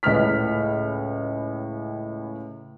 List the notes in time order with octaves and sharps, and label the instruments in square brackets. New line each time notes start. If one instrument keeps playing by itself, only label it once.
[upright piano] C#2 A2 B4 F6 B6